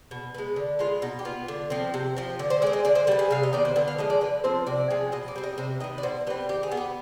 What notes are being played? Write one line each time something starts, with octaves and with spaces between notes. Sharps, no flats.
B2
G#3 B3
D3
G#3 B3 F4
B2 D#4
G4
B3 F4
D3
F3 C4
C3
F3 C4
D3
C5
G#3 C4 D5
D#5
D3 D5
C5
G3 B3 B4
G#4
C3 F5
D#5
D#3 B3 D5
C5
D3 B4
F5
F3 G#3 D#5
D5
D3 B4
F3 C4 C5
C3 D5
F3 G#3 C4
B2 D#5
D5
G3 C4
D#5
C3 C5
D#3 B3 D#5
D5
B2 C5
G3 C4 B4
D#3 G4
G#4
B3
G4